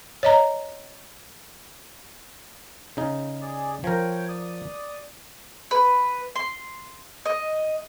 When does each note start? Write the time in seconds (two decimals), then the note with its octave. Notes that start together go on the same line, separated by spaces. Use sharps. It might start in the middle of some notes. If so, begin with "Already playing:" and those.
0.23 C#5 D#5 A#5
2.97 C#3 D#4
3.41 G#4 D5
3.84 F3 A#4 C#5 G5
4.29 D5 D#6
5.71 B4
6.36 C6
7.25 D#5